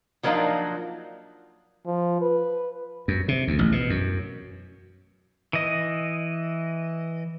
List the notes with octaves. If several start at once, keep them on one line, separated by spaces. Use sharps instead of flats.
F3 F#3 A#3 D4 D#4 F4
F3
B4
F#2
C3
D2
A1
B2
F#2
E3 D#5